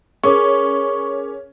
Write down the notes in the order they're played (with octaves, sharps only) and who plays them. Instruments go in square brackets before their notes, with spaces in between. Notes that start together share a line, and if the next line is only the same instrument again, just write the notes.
[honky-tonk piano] C#4 [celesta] G#4 A#4 D6 [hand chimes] C#6